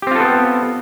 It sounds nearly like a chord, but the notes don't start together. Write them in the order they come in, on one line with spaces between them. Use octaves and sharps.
G4 C4 F4 A4 B3